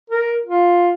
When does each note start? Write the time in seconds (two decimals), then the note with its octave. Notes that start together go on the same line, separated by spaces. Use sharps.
0.10 A#4
0.46 F4